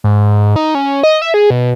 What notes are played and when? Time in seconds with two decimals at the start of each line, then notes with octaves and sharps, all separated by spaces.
0.04 G#2
0.56 D#4
0.75 C#4
1.03 D#5
1.22 E5
1.34 G#4
1.50 B2